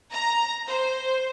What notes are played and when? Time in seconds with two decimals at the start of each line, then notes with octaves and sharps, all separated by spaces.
0.12 A#5
0.68 C5